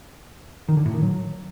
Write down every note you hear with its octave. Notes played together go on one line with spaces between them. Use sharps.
D#3
D3
A2
D#3
F#3